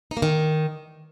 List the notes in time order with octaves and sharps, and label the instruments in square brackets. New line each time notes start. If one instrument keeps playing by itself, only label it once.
[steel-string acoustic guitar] D#4
A#3
D#3